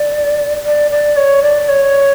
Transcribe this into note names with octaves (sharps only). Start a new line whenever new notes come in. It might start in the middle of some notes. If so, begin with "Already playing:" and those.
Already playing: D5
D5
D5
C#5
D5
C#5